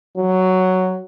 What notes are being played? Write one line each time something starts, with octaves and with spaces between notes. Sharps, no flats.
F#3